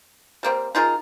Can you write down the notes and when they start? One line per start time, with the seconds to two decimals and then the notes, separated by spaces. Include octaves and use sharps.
0.43 G3 A#3 C4
0.75 D#4 F4 G#4 A#4